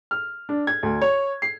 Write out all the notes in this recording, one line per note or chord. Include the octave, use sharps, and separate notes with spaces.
F6
D4
G#6
D2
C#5
C7